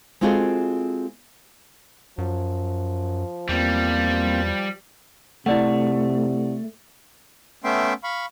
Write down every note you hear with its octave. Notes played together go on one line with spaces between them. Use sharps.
G#3 C4 F4 F#4 G#4 A4
F#2 F3
E2 G3 A#3 C4 F4
C3 A3 E4 D5 F#5
A3 B3 C#4 E5 G5 C6
F5 B5 C#6